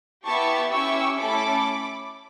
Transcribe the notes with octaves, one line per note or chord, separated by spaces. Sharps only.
B3 E4 G4 A5 C#6
C#4 E4 G4 C#6 E6
A3 C#4 E4 A4 B5 D6